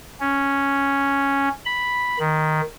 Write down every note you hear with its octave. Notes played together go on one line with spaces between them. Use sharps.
C#4
B5
D#3